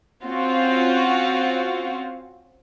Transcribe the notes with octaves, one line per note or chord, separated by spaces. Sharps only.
C4 C#4 F4 F#4